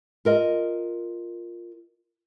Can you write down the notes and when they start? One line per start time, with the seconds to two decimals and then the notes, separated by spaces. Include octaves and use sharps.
0.25 F4 A#4 D#5